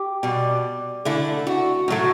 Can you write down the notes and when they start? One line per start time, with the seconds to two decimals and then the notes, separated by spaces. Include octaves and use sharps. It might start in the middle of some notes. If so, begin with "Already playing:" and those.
Already playing: G4
0.23 B2 G3
1.05 D3 A3 E4
1.47 F#4
1.88 A2 F#3 A3